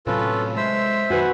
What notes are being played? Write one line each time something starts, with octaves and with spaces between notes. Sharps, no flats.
A2 C3 F#3 C#4 F4 A4 B4
G#3 C5 E5 E6
F#2 D#3 F#4 B4 F#5 G#5